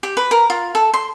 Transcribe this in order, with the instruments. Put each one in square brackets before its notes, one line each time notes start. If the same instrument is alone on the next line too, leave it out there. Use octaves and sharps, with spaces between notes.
[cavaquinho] G4
B4
A#4
F4
A4
C6